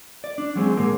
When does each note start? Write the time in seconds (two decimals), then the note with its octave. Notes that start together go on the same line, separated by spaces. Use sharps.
0.24 D5
0.38 D4
0.56 F#3 G#3 C4 G#4
0.77 A2 D3 G#3 A#3